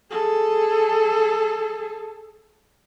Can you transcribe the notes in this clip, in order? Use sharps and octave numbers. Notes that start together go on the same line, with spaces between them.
G#4 A4